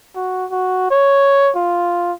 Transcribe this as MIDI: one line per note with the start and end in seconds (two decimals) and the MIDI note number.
0.16 0.46 66
0.51 0.87 66
0.91 1.51 73
1.56 2.13 65